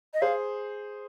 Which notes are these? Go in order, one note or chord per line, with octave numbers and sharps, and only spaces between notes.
D#5
G#4 C5 F5